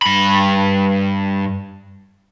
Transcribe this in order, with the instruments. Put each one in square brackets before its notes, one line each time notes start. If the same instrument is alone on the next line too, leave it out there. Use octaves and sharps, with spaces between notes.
[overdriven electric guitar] G2 B5